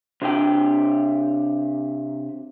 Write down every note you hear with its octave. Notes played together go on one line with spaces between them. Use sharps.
C3 D4 G4 G5